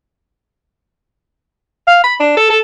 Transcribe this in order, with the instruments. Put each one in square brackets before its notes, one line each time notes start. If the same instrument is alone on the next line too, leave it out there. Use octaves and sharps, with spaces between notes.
[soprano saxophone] F5
B5
D4
A4
A4